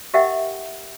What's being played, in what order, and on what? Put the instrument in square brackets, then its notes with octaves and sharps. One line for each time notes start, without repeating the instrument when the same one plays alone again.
[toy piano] G4 A#4 D#5 E5 F#5 G5